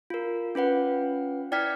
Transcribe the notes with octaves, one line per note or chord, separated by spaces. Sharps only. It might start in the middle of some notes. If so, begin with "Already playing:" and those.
F4 A#4
C#4 F4 B4 F#5
E4 D5 G5 F6 G#6 B6